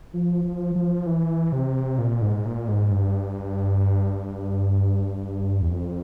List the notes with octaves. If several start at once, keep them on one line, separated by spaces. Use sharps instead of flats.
F3
F3
F3
E3
C3
A#2
G#2
A#2
G#2
G2
E2
F2